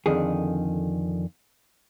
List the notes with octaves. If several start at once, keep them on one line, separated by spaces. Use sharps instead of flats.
F2 D3 D#3 G#4